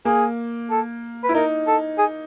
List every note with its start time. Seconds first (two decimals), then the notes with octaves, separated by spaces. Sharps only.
0.05 A#3 G#4
0.70 A4
1.23 B4
1.29 E4
1.35 D#4 A#4
1.67 A4
1.98 G#4